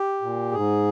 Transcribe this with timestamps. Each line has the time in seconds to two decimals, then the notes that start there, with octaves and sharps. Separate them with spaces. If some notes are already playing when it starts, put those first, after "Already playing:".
Already playing: G4
0.22 A#2
0.52 G#2 G#4